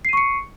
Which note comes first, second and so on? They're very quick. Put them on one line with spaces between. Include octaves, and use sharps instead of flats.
C7 D#7 C#6 C#7